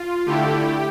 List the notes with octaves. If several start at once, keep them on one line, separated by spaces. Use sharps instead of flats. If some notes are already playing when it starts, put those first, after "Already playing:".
Already playing: F4
D3 A3 E4 G4